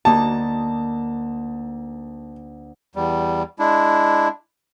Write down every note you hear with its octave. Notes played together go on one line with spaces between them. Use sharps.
D2 A#3 D#4 A5
E2 G3
G#3 D4 E4